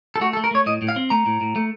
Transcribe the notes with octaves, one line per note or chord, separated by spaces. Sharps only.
A4
A3 F#4
A4
A3
A#4
A3 C#5
A2 D#5
A2
F5
C4
A3 A#5
A2
A2
A3